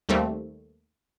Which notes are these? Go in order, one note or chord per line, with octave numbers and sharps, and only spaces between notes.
D#2 G3 A3 A#3 C4